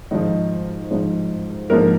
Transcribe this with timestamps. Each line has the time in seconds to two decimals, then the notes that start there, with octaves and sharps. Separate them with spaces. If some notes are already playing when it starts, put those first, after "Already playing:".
0.11 G#2 D#3 F3 D#4
0.91 G#2 F3
1.70 G#2 F3 A#3 A#4